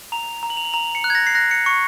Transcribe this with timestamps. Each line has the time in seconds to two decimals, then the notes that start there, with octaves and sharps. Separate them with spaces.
0.12 A#5 F7
0.43 A#5
0.50 F#7
0.57 F7
0.65 F#7
0.73 A#5 F7
0.95 C#7
1.04 F#6
1.10 G#6
1.15 A#6
1.27 C7
1.35 F#6 A#6
1.51 C#7
1.66 C#6 C#7